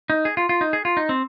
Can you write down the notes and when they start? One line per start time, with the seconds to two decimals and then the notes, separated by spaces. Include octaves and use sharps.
0.10 D#4
0.25 G#4
0.37 F4
0.49 F4
0.61 D#4
0.73 G#4
0.85 F4
0.97 D#4
1.09 C4